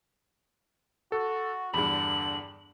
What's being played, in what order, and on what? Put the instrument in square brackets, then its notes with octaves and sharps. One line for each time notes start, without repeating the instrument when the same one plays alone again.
[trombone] F#4 [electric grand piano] A4
[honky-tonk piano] E2 G2 [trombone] D3 [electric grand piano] B5 [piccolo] F#7